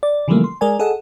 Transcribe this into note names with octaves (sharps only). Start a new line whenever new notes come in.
D5
C#3 E3 F3 G3 A3 A#3
C6
G#3 A#4 D5 G#5
G#4 A4 D#5 F#5